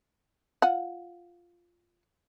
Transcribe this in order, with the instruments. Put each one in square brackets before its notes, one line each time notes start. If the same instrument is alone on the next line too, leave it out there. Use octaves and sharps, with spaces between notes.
[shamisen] F4 F#5